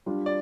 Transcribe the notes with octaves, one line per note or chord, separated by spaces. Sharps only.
G3 D4 F4
D5